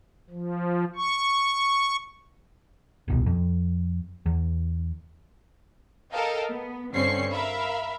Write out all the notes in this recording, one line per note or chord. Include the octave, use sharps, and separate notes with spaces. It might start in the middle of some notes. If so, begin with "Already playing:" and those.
F3
C#6
D#1 C2 B2
F2
E2
A4 A#4 D#5 F5 G5
B3
G2 D3 C4 C#4 C#6 C7
A#4 E5 F5 B5